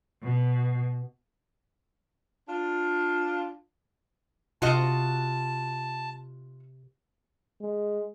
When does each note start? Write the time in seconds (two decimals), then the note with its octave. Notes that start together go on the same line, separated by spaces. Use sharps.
0.22 B2
2.49 D4 F4
4.62 C3 F4 F#4 D#5 A5
7.61 G#3